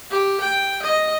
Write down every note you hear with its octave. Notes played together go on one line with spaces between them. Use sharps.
G4
G5
D#5